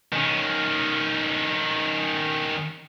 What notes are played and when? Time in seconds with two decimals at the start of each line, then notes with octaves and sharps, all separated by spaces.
0.12 D#3 C#4